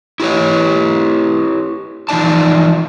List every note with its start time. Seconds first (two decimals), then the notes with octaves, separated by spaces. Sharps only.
0.20 E4 G4 B4 C#5
2.09 E3 F3 D#4 D5 A5